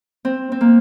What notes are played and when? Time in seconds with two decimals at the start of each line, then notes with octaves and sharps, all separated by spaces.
0.25 C4
0.52 C4
0.61 A#3